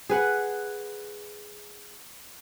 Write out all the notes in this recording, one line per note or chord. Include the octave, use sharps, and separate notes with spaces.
G#4 B4 F#5